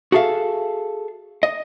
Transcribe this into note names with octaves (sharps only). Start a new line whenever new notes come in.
F#4 G#4 A4 E5 F5
D#5